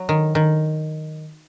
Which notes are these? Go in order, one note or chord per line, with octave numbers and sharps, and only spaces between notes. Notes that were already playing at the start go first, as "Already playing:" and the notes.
Already playing: F#3
D#3
D#3